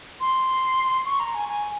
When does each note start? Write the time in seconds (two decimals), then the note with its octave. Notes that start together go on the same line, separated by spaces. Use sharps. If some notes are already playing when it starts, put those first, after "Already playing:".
0.21 C6
1.05 C#6
1.20 A#5
1.34 G#5
1.49 G#5